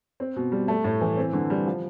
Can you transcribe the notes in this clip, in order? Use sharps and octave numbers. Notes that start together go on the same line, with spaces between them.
C4
B2
G3
A3
A2
E3
C4
D3
G3
F3